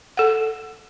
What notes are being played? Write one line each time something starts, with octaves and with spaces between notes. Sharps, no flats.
A4 F#5